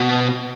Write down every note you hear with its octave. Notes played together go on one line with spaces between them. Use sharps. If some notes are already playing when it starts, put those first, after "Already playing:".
Already playing: B2